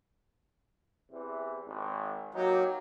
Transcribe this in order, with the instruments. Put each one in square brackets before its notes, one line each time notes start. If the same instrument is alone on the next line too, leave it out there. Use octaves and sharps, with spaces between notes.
[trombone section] E2 C3 E3
G#1
[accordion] F#3 [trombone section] A#3 D#4 G4